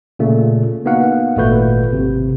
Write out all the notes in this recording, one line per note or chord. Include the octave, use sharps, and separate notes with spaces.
A#2 C#3 A3
A#3 B3 D#4 F#4 F5 F#5
G#1 A#2 A3 F#4 B4 G6
G#1 C3